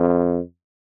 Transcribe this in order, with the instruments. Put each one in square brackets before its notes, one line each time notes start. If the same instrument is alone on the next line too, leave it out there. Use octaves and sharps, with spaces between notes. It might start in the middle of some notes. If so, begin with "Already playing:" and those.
Already playing: [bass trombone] F2